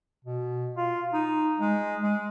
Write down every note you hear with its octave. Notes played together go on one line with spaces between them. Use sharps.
B2
F4
D#4
G#3
G#3